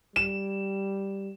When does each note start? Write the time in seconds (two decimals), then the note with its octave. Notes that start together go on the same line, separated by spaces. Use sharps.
0.16 G3 E7